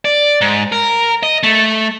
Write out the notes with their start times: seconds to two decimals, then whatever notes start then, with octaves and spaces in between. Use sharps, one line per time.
0.05 D5
0.41 G#2
0.72 A#4
1.23 D#5
1.43 A3